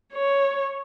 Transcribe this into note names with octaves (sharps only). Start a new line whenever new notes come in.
C#5